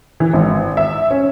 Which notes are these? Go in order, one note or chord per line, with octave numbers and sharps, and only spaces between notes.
E3
G#1
E5
C#4